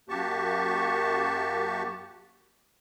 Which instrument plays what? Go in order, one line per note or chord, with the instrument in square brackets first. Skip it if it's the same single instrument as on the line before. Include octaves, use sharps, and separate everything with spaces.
[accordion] F#2 A#3 F#4 G4 A5 C#6